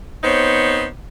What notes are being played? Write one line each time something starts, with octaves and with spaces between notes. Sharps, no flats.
B3 C4 D#4 C5 C#5